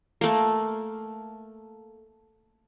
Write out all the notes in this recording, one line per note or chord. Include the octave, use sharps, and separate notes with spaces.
A3 A#3